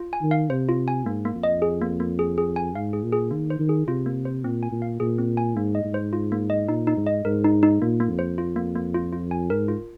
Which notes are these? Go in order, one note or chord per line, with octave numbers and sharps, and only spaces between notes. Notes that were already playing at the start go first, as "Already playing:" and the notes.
Already playing: F4
G#5
D#3
F5
C3 C5
F4
G#5
G#2 A#3
A#3
F2
D#5
G#4
A#3
A#3
G#4
G#4
G#5
G#2 F5
G#4
A#2
G#4
D#3 A#3
C5
D#3
G#4
C3 F4
A#3
C5
A#2 C4
G#5
A#2
F5
A#2 G#4
C4
G#5
G#2 A#3
D#5
G#2
C5
F4
A#3
D#5
A#2 D#4
D#4
G#2
D#5
G#2 A#4
D#4
D#4
A#2 A#3
A#3
F2
C5
F4
A#3
A#3
F4
F4
G#5
G#2 A#4
F4